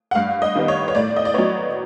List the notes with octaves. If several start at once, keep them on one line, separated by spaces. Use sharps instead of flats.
F#5
G2 F5
D#5
D#3 G3 B3
C#5
C#5
A2 D5
D#5
D5
F#3 B3 C#5